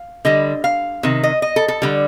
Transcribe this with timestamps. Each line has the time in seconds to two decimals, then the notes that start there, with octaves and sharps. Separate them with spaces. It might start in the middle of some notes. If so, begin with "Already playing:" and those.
Already playing: F5
0.25 D3 G3 D#5
0.64 F5
1.03 C3 D#3
1.23 D#5
1.42 D#5
1.56 A4
1.68 A4
1.82 D3 G3